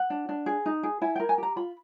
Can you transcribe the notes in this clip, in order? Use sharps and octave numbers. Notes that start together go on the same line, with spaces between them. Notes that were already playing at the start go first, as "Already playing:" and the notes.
Already playing: F#5
D4
D4
G#4
D#4
G#4
E4 G#5
A#4 G5
G#5
G4 A#5
F4 B5